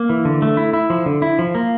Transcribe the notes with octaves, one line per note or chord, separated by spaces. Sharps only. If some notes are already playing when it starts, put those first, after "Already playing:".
Already playing: A#3
E3
D3
A3
E4
E4
F3
D3
E4
F3
A#3